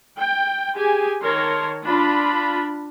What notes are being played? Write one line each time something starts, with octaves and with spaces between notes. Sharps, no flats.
G5
G4 G#4 G#5
D#3 A#4 C#5 A5 C6
D4 F4 B5